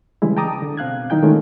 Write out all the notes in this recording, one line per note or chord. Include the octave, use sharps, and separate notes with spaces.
C#3 E3 G3 G#3 E4
G5 A5 A#5 D6 D#6
D3
B2 C4 F5 F#6 G#6
D#3 F#3 D#4 E4 G5 G6
D#3 G#3 A3 C#4 F4